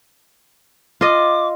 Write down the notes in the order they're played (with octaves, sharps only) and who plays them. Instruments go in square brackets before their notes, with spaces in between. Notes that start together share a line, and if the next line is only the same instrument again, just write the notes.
[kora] F4 D#5 [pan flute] D6